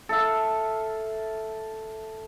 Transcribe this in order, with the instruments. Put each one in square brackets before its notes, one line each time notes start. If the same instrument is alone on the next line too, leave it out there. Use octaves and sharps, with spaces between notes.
[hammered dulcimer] A4 E5 F5